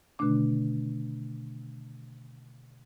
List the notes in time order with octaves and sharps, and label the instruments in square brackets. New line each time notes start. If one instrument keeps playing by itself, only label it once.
[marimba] B2 D3 D#3 A3 D4 D6